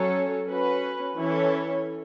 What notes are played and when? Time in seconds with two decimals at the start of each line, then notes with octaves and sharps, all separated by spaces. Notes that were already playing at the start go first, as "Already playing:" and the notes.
Already playing: F#3 C#4 A4 C#5
0.46 C#4 F#4 B4
1.16 E3 C#4 E4 A4 C#5